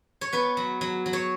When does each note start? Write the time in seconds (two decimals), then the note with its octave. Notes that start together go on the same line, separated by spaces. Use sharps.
0.21 C#5
0.32 B3 B4
0.57 F#3
0.81 F#3
1.06 F#3
1.13 C#5